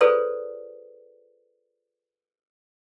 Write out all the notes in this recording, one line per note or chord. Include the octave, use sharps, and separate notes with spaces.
F4 G#4 A4 B4 C5 D5